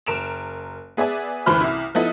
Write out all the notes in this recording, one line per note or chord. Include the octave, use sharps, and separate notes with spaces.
F#1 A#4 D7 E7 F7
B3 G#4 D5 E5 G#5
F#1 D2 E3 C5 B5 F6
C2 E4
F3 B3 D#4 E4 A4 D#5